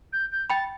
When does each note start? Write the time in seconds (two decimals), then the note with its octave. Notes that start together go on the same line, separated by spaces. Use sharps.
0.13 G6
0.32 G6
0.50 G5 B5 A6